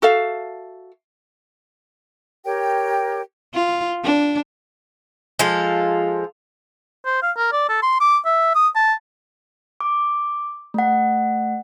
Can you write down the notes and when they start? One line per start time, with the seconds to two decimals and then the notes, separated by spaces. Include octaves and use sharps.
0.02 F#4 A4 E5 F5
2.44 G4 A#4 C#5 G5
3.54 F4
4.04 D4
5.39 F3 G#3 F4 A4
7.06 C5
7.23 F5
7.37 A#4
7.52 D5
7.69 A4
7.82 C6
8.00 D6
8.25 E5
8.55 D#6
8.75 A5
9.81 D6
10.74 A3 F#5